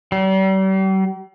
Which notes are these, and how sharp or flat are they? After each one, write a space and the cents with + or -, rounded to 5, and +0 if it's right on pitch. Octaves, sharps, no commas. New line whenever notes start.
G3 -40